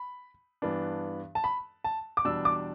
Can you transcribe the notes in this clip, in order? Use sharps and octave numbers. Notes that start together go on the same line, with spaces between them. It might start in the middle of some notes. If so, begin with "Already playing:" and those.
Already playing: B5
G2 E3 B3 D4
A5
B5
A5
D6
E2 B2 G3 D4 E6
D6